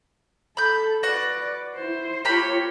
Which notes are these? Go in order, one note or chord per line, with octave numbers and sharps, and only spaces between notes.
A4 B5 G6
F#4 B4 D5 F#5
E4 C5
A#3 F4 G4 C#5 B5